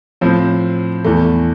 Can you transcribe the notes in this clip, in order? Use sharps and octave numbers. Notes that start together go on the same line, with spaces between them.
A2 F3 C4
E2 E3 A3